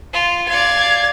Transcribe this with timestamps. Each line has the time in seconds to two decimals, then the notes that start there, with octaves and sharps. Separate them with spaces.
0.13 F4
0.48 D5 F5 G#6